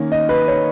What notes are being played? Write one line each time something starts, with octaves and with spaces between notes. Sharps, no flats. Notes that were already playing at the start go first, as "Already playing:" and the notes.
Already playing: D#3 A#3 C#4
D#5
B4
C#5